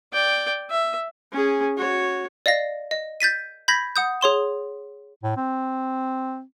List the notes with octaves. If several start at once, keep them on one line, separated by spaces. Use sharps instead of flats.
D5 G5
E5
C#4 G#4
F#4 C#5
D5 D#5 F5 A#6
D#5
G6 A6 B6 D#7
B5 G6 G#6 A#6 B6
F#5 D#6 G6
G#4 C#5 C6 E7
A2
C4